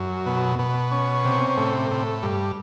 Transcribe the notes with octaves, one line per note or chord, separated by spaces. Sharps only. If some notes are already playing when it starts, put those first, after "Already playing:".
Already playing: F#2
B2
B2
C#4
C3
A2
A2
G2